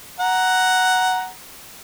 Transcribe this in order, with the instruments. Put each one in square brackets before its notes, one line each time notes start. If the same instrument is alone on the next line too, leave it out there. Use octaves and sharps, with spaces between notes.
[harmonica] F#5 A#5